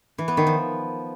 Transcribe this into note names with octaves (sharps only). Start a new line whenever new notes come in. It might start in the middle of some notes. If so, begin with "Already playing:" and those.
E3
B3
D#3
F3